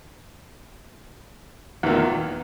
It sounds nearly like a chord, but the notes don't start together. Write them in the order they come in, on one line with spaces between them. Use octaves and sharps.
E2 D#3 A#2